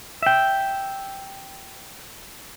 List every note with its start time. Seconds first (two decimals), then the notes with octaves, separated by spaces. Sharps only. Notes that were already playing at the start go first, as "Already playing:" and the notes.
0.22 E5 G5